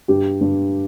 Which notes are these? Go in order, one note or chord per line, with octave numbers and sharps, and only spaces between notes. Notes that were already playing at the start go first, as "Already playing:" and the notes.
G2 G4
G2